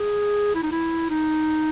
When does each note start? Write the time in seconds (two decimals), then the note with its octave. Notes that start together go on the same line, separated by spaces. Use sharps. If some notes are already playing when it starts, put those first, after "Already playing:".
Already playing: G#4
0.55 E4
0.63 D#4
0.71 E4
1.10 D#4